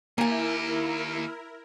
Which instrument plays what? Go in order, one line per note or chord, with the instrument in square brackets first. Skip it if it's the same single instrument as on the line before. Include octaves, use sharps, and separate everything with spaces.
[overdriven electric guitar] D#2 G4 [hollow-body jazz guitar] A#3 G#5 [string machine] E4 A#4